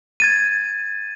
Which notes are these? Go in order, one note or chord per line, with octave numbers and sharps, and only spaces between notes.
G#6 A6 D#7